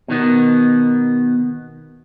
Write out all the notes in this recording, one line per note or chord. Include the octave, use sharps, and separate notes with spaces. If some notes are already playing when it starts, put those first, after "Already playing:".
B2 D#3 B3